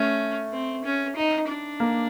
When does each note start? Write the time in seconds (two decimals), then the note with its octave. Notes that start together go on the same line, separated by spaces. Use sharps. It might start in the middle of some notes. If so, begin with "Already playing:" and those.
Already playing: A3 C#4
0.53 C4
0.84 C#4
1.16 D#4
1.48 D4
1.80 A#3